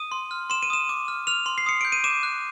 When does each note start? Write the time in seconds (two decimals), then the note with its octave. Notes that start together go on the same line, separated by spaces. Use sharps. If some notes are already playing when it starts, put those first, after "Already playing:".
Already playing: D#6 D#7
0.12 C6
0.31 F6
0.50 C6 E7
0.63 D#7
0.70 D#6 E7
0.89 D6
1.08 F6
1.27 F6 F7
1.46 C6
1.58 C7
1.66 D#6 C#7
1.81 G6 D7
1.92 D#7
2.04 D6 E7
2.23 F#6